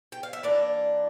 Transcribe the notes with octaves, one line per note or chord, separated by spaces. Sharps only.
G5
F5
E5
E3 A#3 D4 D5